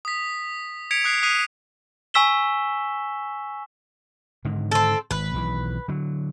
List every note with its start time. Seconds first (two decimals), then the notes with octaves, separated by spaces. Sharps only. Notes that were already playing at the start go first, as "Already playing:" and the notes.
0.05 D#6 B6
0.91 G#6 B6 C#7 D7 F7
1.04 D#6 F#6 C7 C#7
1.23 D#6 F#6 B6 C7 D#7 F7
2.14 G#5 C#6 E6 B6 E7 G7
4.45 G#2 D3 D#3
4.71 C4 A4
5.11 G#1 B4
5.34 B1 D#3 E3
5.88 D3 F#3